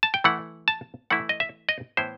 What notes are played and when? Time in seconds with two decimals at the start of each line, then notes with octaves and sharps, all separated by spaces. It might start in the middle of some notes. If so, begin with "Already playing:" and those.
0.03 A5
0.14 G5
0.24 E3 A3 E4 F#5
0.68 A5
1.10 E3 A3 E4 F#5
1.29 D#5
1.40 E5
1.69 D#5
1.97 A2 E3 B3 E4 C5